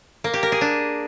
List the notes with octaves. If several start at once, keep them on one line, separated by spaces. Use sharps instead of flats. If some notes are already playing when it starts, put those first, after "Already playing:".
A#3
G4
A#4
G#4
D4